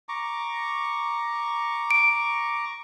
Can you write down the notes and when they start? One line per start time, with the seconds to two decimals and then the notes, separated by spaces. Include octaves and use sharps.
0.09 A#5 C#6 D6
1.91 D7